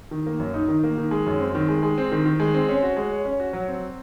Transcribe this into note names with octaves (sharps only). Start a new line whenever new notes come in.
D#3
A#3
F#2
D#4
D#3
A#3
D#3
G#3
F#2
C4
D#3
G#3
G#3
C4
D#3
D#3
G#3
C4
C#4
F#4
G#3
C#5
C#4
F#4
F#3
C4